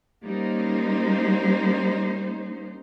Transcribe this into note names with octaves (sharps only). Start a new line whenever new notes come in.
G3 A#3 C#4 D#4 C5